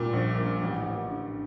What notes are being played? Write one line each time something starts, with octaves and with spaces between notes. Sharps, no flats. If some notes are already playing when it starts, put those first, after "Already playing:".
Already playing: A#2 G3
A#1
A#3
A1
A1
D3